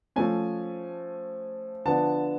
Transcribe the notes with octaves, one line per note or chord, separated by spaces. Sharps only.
F3 A3 C#4 G#5
D3 F3 B3 D4 A5